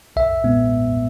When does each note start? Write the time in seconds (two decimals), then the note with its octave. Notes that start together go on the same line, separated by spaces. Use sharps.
0.16 B1 E5
0.44 A#2 G#3 B3